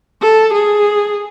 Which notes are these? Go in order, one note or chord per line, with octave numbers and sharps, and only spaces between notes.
A4
G#4